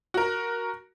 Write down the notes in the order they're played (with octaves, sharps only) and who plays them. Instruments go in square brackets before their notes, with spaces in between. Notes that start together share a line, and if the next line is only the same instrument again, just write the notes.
[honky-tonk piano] F#4 A#4